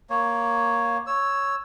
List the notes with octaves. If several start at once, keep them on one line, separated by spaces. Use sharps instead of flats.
A#3 C#5
C#5 E6